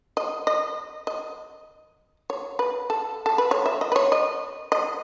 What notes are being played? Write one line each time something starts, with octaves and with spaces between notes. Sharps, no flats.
D#5
D#5
D#5
C#5
B4
A4
A4
B4
C#5
E5
D#5
B4
C#5
D#5
D#5